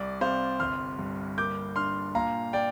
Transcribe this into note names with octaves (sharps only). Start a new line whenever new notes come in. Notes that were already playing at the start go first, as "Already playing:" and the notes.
Already playing: C2 D5
C3 C5 F5
G1 C6 F6
G2
A#3 D6 G6
D4 C6 F6
A#2 F5 A#5
D5 G5